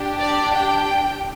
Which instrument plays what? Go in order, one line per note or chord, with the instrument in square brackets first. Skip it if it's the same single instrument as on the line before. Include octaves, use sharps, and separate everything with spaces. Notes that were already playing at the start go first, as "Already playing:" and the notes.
Already playing: [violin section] D4 G4
D5
G5